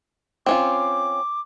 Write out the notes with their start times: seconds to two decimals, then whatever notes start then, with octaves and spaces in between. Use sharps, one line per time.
0.46 C4 C#4 F4 D6